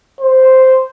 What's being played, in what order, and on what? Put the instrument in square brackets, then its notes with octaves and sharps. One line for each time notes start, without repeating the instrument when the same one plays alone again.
[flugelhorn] C5